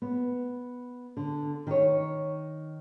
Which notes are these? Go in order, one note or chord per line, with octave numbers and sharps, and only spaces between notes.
B3
D3
D#3 C#5